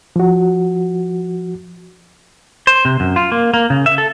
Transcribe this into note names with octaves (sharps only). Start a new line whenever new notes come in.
F3 F#4
C5
C3
F#2
F4
A#3
A#3
C#3
E5
A4